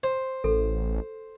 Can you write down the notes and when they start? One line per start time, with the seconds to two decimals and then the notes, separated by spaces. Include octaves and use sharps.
0.03 C5
0.44 A1 A4